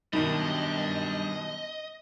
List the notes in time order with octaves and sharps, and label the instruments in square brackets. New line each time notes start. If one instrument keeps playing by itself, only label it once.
[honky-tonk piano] F#2 B2 D#3 [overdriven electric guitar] G3 D4 [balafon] D#4 [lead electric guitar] D#5